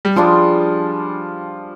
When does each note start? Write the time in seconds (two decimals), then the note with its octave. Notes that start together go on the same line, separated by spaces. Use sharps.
0.05 G3
0.16 F3 G3 D4 F4 G#4